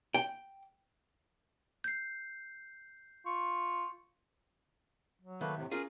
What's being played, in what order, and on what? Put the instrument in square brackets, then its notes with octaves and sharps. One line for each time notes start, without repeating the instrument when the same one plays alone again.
[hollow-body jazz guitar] G5
[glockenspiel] G6 C7
[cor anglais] F4 [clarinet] C#6
[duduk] F#3
[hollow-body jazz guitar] D#3 [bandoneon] A3 A#3 B4
[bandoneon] A2 C3
[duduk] C#4 [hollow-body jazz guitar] F4 G#4 [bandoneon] A#4